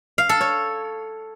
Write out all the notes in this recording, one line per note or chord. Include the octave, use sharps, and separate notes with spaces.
F5
A4
C#5